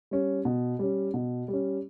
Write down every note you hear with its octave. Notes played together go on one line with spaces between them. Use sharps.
G3 C#4
B2
G3 C#4
B2
G3
C#4